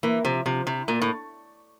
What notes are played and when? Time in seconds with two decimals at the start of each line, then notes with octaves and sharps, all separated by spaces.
0.03 E3 A#3
0.25 C3 F3
0.46 C3 F3
0.67 C3 E4
0.88 A#2 A#3
1.01 A2